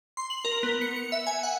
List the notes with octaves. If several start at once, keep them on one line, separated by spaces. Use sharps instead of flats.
C6
F#7
A#4
B3
C#7
C#7
E5
G#5
F#5